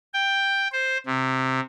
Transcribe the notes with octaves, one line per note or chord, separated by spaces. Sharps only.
G5
C5
C3